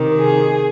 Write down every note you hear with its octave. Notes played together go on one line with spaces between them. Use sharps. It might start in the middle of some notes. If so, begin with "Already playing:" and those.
Already playing: C3 D#3
G#4